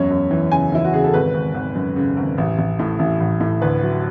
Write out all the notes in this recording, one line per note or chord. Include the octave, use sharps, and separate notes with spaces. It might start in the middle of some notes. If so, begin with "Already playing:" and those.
Already playing: E1 F#2 C#5
F#2
E3
C#3 G#5
E3 E4
F#4
C#3 G#4
A4
G#1 B4
G#1
G#1
F#2
C#3
G#1
A1
A1
A2
A1
A1
A2
D2 B4
F#3